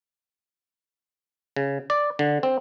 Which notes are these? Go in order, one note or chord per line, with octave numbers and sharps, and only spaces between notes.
C#3
D5
D3
C4